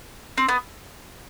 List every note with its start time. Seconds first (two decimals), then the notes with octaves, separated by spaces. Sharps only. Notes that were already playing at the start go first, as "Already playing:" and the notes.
0.38 C4
0.49 B3